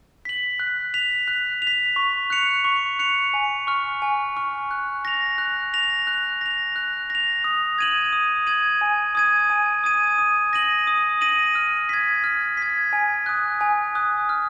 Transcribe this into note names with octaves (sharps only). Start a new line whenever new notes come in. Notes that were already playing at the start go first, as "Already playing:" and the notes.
B6 F#7
F#6
B6 F7
F#6
F7
B6
C#6
F#6 C#7 F7
C#6
F#6 C#7 F7
G#5
C#6 F6
G#5
C#6 F6
F#6
A#6 F7
F#6
A#6 F7
F#6
A#6 F7
F#6
A#6 F7
D#6
G#6 D#7 F#7
D#6
G#6 D#7 F#7
G#5
D#6 G#6 D#7
G#5
D#6 G#6 D#7
D#6
A#6 D#7 F#7
D#6
A#6 D#7 F#7
F6
G#6 B6
F6
G#6 B6
G#5
D#6 F#6
G#5
D#6 F#6
F6